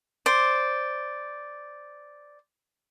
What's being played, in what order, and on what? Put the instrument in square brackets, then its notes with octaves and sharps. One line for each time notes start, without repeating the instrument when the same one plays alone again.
[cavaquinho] C5 D5